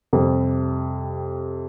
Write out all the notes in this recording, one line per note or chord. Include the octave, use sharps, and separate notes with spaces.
F2 C3 G3